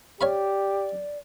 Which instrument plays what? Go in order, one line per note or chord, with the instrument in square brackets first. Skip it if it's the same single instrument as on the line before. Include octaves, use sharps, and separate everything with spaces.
[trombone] G4 [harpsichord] C#5 F5 B5 [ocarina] D5